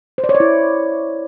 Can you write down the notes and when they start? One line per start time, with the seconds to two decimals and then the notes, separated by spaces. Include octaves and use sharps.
0.18 C5
0.24 D5
0.29 C#5
0.35 D5
0.40 E4